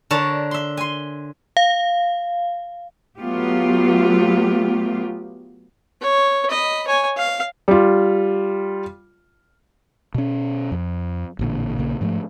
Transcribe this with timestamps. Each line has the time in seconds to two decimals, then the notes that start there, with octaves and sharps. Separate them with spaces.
0.11 D3 A#4 C#5 A5
0.51 E5 C6
0.77 G#5 C6
1.57 F5
3.18 F#3 A3 B3 F4 G4
6.02 C#5
6.49 D#5 B5
6.87 C#5 G#5
7.18 F5
7.68 G3 F4
10.14 B2 C#4
10.72 F2
11.39 A1 A#2 D3
11.78 A#1 C#3 A#3
12.01 G#2 F3 G#3 A3